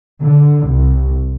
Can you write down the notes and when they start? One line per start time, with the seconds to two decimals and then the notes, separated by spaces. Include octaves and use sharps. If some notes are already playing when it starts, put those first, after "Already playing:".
0.24 D3
0.67 C2